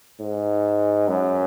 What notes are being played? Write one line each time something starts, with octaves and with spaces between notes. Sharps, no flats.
G#2
F#2